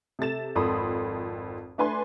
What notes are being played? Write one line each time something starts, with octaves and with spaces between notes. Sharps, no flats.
C3 A4 A6 E7
G#1 F2 A4 B5 C6 D#6
A3 D4 B4 G#5 C6